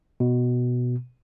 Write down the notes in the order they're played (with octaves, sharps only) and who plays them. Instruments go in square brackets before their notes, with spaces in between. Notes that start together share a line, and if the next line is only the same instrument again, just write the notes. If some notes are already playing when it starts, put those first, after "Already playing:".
[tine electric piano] B2